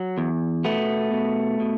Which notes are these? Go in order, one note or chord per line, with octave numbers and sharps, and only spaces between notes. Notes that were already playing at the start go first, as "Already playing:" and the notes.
Already playing: F#3
E2
B2 A3 B3
B2
B2